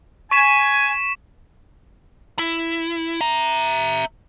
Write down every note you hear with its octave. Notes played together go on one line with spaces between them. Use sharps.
G#5 C#6 B6 E7
E4
E5 A#5